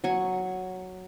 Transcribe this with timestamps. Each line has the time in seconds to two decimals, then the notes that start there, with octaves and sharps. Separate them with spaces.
0.04 F#3 G#5 C#6